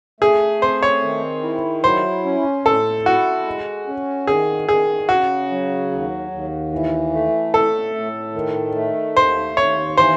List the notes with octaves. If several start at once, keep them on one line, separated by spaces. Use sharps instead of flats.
A3 G#4
C4 C5
C#5
D#3
E4
F#3 C5
C#4
A2 A4
E4 F#4
G#3
C#4
D#3 G#4
D#3 G#4
C#3 F#4
F#3
D#2
D#2
E3
A3
A2 A4
A2
D#3
A3
D#2 C5
D#2 C#5
E3 C5